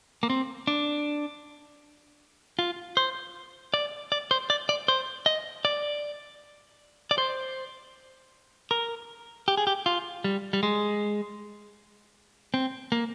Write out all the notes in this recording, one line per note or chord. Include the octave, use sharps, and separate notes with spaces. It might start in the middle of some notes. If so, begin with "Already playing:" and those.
A#3
C4
D4
F4
C5
D5
D5
C5
D5
D5
C5
D#5
D5
D5
C5
A#4
G4
G#4
G4
F4
G3
G3
G#3
C4
A#3